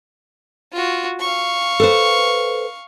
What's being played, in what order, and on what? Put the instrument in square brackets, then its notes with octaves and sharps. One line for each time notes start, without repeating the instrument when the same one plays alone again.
[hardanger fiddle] F4 F#4
F5 C#6
[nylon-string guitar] A4 B4 C5